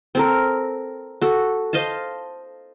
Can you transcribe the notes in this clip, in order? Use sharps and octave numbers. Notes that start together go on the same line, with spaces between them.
C4 A4 A#4
F#4 A4
C5 D#5 F5 A5